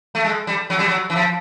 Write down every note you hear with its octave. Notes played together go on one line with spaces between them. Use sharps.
A3
G#3
G3
F#3
G3
F#3
E3
F3